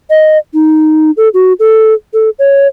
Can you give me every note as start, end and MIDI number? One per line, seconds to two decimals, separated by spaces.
0.10 0.38 75
0.54 1.11 63
1.17 1.29 69
1.34 1.53 66
1.60 1.94 69
2.14 2.30 69
2.39 2.67 73